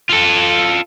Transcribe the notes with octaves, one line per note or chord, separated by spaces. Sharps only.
F4 A4